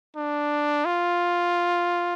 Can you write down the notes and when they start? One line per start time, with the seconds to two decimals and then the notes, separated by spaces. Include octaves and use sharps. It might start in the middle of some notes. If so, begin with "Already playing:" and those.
0.16 D4
0.85 F4